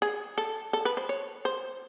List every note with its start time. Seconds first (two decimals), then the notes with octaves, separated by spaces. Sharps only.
0.02 G#4
0.38 A4
0.73 A4
0.85 B4
0.97 C5
1.09 C#5
1.45 C5